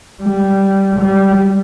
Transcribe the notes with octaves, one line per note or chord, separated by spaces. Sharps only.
G3
G3